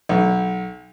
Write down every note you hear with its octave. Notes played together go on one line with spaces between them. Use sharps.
B1